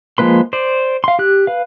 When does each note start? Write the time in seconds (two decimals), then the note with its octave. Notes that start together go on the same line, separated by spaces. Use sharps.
0.18 F3 G#3 A#3 B4 C6
0.53 C5 D5
1.04 F5 C6
1.19 G4 F#6
1.47 B4 F5